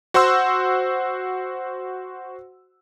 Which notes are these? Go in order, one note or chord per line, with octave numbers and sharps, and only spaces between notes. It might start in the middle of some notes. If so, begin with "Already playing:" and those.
F#4 C5 F#5 C6 E6